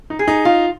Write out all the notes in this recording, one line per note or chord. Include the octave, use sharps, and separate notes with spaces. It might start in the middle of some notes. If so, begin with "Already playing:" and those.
D#4
G#4
D#4
F4